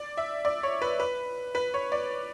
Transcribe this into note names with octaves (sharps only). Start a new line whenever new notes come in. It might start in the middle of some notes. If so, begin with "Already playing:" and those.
Already playing: D5
E5
D5
C#5
B4
B4
B4
C#5
D5